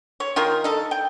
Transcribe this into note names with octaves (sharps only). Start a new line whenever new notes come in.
C#5
D#3 F4 A#4
D#4 A4
G5